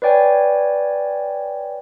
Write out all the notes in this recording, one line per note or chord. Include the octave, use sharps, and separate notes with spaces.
B4 C#5 D5 G5 G#5